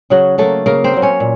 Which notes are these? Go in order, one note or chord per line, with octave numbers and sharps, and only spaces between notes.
C#3 F#3 F#4
F#3 A3 A#3 A4
C#3 A#3 A#4
C4 C5
F#3 A#3
C#4 C#5
A#2